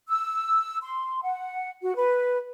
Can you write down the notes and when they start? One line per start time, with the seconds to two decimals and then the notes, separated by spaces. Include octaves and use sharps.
0.09 E6
0.83 C6
1.23 F#5
1.83 F#4
1.96 B4